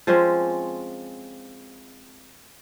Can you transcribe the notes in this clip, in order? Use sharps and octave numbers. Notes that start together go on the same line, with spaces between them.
F3 G#3 C4 C#4